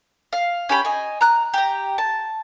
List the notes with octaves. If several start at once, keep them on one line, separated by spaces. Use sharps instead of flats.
F5
C#4 G4 B5
D#5 G#5
A#5 F#6
G4 A#5
A5